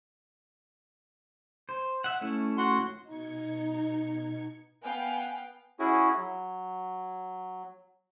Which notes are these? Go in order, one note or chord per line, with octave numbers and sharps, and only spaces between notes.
C5
E5 F#5
A3 C#4 E4
F#4 F#5 C6
B2 D#4 G#6 C#7
B3 F5 G5 G#5
C#4 E4 F#4 G#4
F#3